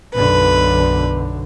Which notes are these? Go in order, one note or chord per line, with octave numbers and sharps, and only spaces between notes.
B1 F#2 D3 B4